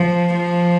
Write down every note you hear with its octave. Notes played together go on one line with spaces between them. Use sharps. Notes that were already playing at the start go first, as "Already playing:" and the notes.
Already playing: F3
F3